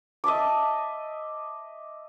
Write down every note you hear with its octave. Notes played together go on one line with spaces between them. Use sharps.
D#5 E5 A5 D6